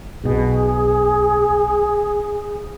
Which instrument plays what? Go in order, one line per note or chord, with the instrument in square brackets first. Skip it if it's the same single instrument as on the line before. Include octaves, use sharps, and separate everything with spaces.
[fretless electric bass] B1 B2 [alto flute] G#4